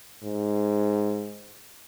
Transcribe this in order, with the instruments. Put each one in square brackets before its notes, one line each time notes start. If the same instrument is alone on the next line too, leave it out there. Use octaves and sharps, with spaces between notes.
[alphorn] G#2